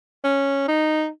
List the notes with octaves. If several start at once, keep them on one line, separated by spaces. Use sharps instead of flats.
C#4
D#4